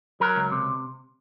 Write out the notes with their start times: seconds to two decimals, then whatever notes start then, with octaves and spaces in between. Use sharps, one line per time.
0.20 F#3 A#4
0.36 C#2
0.52 C3